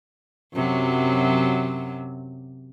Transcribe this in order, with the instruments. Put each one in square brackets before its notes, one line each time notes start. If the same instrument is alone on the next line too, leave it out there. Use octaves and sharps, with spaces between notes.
[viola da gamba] F#2 C3 F#3